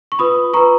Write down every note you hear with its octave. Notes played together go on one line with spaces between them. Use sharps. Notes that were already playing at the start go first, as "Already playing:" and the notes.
C#6
F4 B4 B5 D#6
F4 B4 A#5 C#6